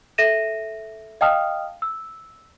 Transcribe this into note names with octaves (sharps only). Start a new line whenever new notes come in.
A4 E5 A#6 D#7 E7
D#5 F5 G5 A5 D#6 F6
E6